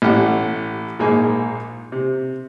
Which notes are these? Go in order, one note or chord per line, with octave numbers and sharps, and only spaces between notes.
A1 G4 F#5
A#1 G#2 A#3 G#4 G#5
C3